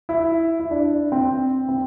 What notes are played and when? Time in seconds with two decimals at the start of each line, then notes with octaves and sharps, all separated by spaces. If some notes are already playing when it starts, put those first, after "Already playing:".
0.09 E4
0.60 E4
0.71 D4
1.12 C4
1.69 C4